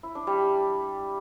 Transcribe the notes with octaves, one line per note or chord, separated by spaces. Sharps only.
E4
D4
G3